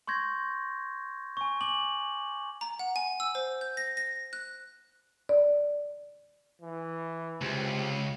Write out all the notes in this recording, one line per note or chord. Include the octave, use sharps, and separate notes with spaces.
C6 C#6 G6 G#6 A#6
G#5 C#6
G#5 D6 F#7
A#5
F#5
G#5
E6
C5
G6
A#6
A#6
F#6
D5
E3
C#2 C3